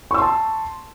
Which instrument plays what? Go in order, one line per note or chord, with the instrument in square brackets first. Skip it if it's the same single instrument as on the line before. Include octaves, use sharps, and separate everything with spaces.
[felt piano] C#6
E6
C6
A5